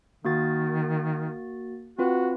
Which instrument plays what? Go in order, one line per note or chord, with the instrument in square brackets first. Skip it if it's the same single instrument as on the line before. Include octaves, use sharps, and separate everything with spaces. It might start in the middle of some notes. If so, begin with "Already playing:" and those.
[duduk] D#3 [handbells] A#3 F#4 A6
[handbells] C4 F4 B4 [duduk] F#4